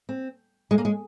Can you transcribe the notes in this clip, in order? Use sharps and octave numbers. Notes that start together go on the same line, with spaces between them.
C4
G#3
A#3
G#3